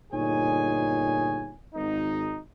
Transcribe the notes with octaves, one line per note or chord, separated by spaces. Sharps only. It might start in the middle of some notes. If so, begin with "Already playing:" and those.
G1 A#2 D#4 G#4 C#5 G#5
G#1 D#4